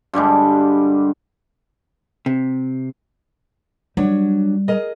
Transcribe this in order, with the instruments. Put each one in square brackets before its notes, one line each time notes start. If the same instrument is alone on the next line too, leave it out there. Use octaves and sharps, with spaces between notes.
[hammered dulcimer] G2 D3 G3 G#3
[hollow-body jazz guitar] C3
[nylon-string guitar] F#3 D4 C#5 [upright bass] G3
[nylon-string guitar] G#4 A#4 D#5